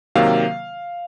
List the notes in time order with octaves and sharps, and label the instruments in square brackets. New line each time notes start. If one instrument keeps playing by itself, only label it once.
[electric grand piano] C3 D#3 F#3 A#3 F5